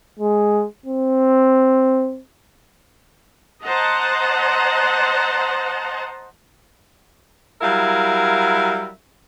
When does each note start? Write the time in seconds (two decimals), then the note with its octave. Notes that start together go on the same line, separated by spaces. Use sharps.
0.19 G#3
0.86 C4
3.64 C5 D#5 F#5 A5 A#5
7.61 F#3 G3 E4 A#4 E5 F5